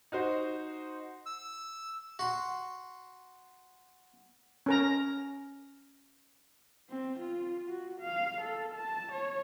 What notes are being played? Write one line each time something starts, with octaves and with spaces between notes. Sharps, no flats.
D#4 F#4 C5
E6
F#4 C6
C#4 A#4 A#5
C4
F4
F#4
F5
A4
A5
C#5